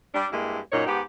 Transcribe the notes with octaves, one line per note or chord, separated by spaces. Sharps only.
G3 D4
G2 G#3 A#3 E4
F#2 A#2 D#4 C#5
G#2 B3 G4